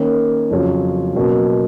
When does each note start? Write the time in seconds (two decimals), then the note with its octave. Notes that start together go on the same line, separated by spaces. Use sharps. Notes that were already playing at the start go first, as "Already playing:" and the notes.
Already playing: D#3 A#3 C#4
0.51 F2 C#3 F#3 C#4 F4
1.15 B2 F#3 A#3 C#4